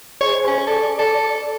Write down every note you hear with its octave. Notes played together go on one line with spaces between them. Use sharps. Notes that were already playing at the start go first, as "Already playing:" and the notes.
G#4 C5 C#5
C#4
A4 D5
A4